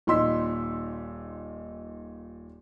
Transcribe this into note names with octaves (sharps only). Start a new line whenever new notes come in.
D#1 A#2 D#4 C6 E6 B6